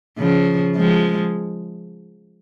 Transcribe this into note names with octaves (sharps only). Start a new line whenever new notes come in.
C#3 F3
F3 G#3